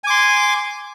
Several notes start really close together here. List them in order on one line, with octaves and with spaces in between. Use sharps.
G#5 D6 C6